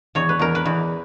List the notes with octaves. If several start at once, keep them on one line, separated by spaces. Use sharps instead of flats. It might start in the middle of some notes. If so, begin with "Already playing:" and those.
E2 C#5
B4
E2 A#4
B4
E2